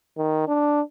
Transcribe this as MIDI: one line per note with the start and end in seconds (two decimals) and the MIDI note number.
0.18 0.48 51
0.48 0.81 62